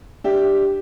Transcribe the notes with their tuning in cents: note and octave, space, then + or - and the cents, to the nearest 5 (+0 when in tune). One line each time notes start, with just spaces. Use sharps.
D4 +10 G4 +0 E5 +0